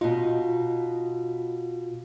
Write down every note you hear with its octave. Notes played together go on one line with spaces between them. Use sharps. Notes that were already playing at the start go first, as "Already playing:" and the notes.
B2 D#4 F4